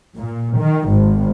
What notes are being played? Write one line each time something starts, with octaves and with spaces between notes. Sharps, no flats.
A#2
D#3
G#1